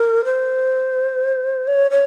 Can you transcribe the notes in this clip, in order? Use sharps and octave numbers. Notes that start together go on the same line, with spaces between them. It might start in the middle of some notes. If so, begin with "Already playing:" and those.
Already playing: A#4
C5
C#5
C#5